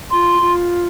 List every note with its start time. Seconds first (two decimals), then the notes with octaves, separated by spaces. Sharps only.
0.10 F4 C6
0.41 F4